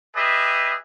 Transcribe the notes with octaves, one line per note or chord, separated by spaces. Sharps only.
G4 G#4 B4 D#5 E5